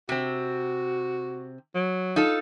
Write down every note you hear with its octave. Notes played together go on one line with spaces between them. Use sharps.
C3 C4 F#4
F#3
D#4 F4 A4